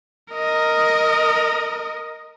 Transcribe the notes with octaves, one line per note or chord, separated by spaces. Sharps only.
A#4 D#5